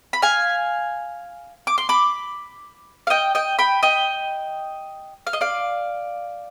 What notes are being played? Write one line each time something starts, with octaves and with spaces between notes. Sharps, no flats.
B5
F5 G#5
D6
C6
B5 D6
F5
D#5 G5
D#5 G5
G5 B5
D#5 G5
F5
D#5
D5 F5